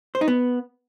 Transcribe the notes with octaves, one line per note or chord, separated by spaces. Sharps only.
C5
D#4
B3